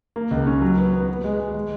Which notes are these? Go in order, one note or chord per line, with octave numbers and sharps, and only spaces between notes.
A#3
C#2
C#4
F#3
B3
B3
B3
G#3
G#3
G#3